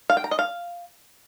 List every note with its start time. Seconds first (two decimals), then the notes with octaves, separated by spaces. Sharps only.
0.10 F5
0.17 G5
0.24 A#5
0.31 D#5
0.39 F5